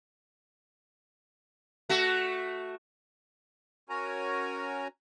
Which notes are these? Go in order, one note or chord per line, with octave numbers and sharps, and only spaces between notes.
A3 F#4
C#4 F#4 A#4 C#5 G#5 A#5